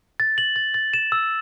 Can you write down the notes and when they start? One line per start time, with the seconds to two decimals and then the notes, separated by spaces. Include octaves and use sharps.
0.20 A6
0.38 F#7
0.56 A6
0.74 A6
0.94 E7
1.12 E6